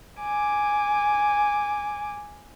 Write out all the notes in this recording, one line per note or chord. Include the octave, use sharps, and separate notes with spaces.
G#5 D6